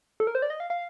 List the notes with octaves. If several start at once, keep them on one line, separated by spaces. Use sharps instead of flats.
A4
A#4
C5
D5
D#5
F5
F5